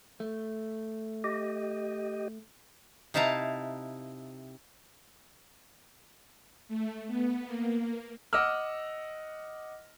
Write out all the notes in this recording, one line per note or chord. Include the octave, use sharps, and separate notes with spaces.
A3
G4 D#5
C3 D#4 E4 F5 A5 A#5
A3
B3
A#3
D#5 F#5 D6 E6 F6